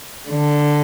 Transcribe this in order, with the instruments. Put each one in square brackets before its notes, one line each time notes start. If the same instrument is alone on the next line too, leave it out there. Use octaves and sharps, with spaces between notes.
[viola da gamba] D3